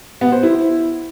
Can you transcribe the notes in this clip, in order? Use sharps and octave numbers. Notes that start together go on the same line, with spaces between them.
B3
C5
E4